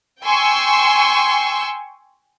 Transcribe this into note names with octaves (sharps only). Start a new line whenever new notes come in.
G5 G#5 C6 C#6 E6